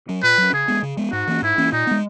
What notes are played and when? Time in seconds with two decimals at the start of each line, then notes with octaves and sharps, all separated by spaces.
0.09 F#3 C#4
0.23 A#2 B4
0.38 F#3 C#4
0.53 C#3 G#4
0.68 G#3 B3
0.83 C#3
0.97 G#3 B3
1.12 G#2 F#4
1.27 E3 A#3 C#4
1.42 G#2 E4
1.58 E3 A#3 C#4
1.72 A#2 D#4
1.87 G#3 B3